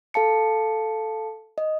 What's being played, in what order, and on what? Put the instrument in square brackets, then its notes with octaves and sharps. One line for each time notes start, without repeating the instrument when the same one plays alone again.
[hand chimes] A4 F5 A5 C#7
D#5